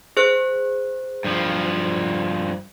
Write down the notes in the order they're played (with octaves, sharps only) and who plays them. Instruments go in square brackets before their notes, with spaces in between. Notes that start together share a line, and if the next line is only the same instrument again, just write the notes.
[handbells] G#4 C5 F#6
[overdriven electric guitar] G2 F3